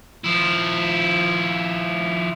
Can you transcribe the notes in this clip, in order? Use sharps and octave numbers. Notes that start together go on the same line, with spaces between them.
F3 E4